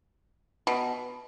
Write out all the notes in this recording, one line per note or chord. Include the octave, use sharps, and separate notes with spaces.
B2